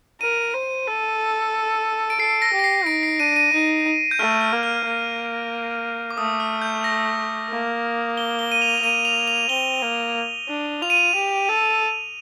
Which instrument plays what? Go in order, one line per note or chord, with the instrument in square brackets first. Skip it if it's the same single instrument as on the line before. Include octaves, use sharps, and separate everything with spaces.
[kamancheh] A#4 [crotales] D#7
[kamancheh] C5
A4
[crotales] D7
[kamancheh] A4 [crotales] C7
[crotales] A#6
[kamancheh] G4
[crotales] A#6
C7
[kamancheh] D#4 [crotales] D7
[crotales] C7
[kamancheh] D4 [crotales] D#7
[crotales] D#7
[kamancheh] D#4
[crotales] G6
[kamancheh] A3 [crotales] F6
[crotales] F6
[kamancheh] A#3
[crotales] F6
[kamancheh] A#3
[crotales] D6
[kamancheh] A3 [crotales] D#6
[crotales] F6
G6
A#6
[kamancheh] A#3
[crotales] G7
G7
D#7
F7
F7
[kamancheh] A#3 [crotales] D#7
[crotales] F7
F7
[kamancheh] C4 [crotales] G7
[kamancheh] A#3
D4
[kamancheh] F4 [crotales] F7
[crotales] D#7
F7
[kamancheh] G4
A4